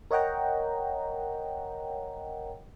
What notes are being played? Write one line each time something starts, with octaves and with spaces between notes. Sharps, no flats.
A#4 C#5 D#5 F#5 G5 A#5